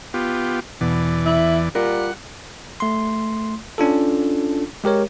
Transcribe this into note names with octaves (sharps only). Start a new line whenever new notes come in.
B3 F4 G4
E2 B2 E3 D5
E4
G3 F4 A#4 F#5
A3 C6
C#4 D4 F4 A4
G#3 G4 A#4 C#5